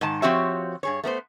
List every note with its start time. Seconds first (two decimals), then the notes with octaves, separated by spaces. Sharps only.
0.01 G#2 D#3 A5
0.22 F3 C4 F#4 G4 C#5 E5
0.83 G2 G#4 C#5
1.04 A3 B3 A#4 C5